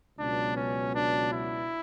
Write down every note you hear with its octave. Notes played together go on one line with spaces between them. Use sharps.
C#2 B2 F#3 B3 D4
C#4
D4
E4